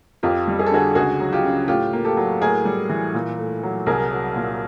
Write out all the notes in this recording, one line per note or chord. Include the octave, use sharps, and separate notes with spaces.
F2 F4 G4
G3
G#4
A4
D3 F#4 G#4
C#2 F#4 G#4
F#3
F4 G4
C#3
A2 F4 G4
A#3
G4 A4
F#3
A2 G#4 A#4
G3
E3
A#2
A3
F#3
C2 G#4 A#4
F#3
A#2